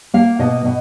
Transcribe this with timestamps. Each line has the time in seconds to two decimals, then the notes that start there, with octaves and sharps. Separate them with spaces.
0.14 A#3 F5
0.39 B2 D#5
0.65 B2